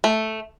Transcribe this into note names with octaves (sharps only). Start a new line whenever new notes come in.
A3